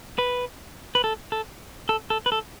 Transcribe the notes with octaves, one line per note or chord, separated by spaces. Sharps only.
B4
B4
A4
A4
A4
A4
B4
A4